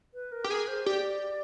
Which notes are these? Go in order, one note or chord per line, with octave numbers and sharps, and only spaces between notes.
B4
A#4
G4
G#4 A#4
C5
G4 D5